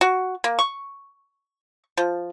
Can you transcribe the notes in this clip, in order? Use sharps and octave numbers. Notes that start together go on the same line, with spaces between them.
F#4
A#3
C#6
F3